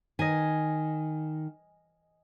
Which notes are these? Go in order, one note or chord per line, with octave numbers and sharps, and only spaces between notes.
D#3 D#5 G#5